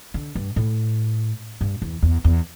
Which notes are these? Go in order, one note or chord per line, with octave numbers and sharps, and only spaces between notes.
D3
G2
A2
G2
E2
E2
E2